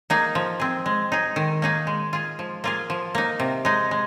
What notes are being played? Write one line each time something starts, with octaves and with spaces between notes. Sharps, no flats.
A#3 D#4 G#4
F3
C4 G#4
G#3
D#4 G#4
D#3
A#3 D#4 G#4
G#3
F4 G#4
F3
A#3 F4 G#4
F3
A#3 D#4
C3
G#3 D#4
G#3